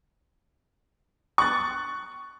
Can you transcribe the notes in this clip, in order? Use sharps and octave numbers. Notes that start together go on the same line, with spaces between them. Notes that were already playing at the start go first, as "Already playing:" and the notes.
C#6 F#6 A6